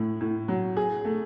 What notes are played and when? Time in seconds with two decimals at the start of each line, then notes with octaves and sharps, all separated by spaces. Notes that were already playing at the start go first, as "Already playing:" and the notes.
Already playing: A2 A3
0.21 A2
0.48 F#3
0.77 G#4
1.05 A3